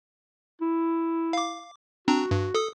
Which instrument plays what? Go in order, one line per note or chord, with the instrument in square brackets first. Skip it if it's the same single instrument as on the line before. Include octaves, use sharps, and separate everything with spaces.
[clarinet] E4
[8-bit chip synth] F5 D6
[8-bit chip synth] C4 D4 A#5 [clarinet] F#4
[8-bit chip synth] G2
A4 D#6